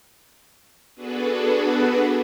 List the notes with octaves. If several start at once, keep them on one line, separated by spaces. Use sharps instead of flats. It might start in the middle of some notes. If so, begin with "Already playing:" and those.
B3 D4 F#4 G#4 A4 B4